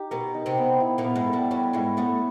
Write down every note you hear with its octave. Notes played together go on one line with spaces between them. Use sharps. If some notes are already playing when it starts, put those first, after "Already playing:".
Already playing: D#4 G4
B2 B3 A#4
D#4
C3 C4
B3
E4
A#2 A#3
B3
G#2 G#3
A4
G2 G3
G2 G3 C#5
G#2 G#3 E4
A2 A3 B3